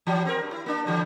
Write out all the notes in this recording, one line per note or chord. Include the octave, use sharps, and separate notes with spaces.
E3 F#3 G3
C4 A#4
G2
E4
A#3 D4
D3 E3 G3